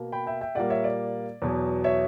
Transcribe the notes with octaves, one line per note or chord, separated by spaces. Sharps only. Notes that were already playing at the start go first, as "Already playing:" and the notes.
Already playing: B2 A#3
G5 B5
E5 G5
E5 G5
A#2 G3 A#3 D5 F#5
C#5 E5
D5
E2 B2 F#3
C#5 E5